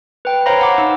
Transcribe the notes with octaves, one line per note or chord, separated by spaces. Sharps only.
B4 G5
C5 C#5 F5 A#5 B5 A#6
F#5 D6
D#4 E6